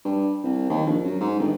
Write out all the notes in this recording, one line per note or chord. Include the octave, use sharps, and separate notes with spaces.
G2
C2
D#2
A#1
F#2
G#2
G1